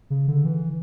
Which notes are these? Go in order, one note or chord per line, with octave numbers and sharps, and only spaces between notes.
C#3
D3
E3